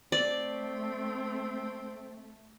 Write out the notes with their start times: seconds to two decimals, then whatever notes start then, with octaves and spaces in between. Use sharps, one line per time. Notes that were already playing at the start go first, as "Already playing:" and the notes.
0.12 A3 C4 D5